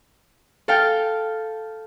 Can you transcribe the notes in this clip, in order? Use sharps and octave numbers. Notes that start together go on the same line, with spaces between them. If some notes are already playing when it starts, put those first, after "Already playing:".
A4 F5 G5